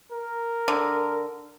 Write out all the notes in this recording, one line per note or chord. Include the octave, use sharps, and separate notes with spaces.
A#4
D3